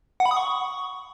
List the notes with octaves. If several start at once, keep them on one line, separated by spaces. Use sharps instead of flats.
F#5
B5
D#6
C#6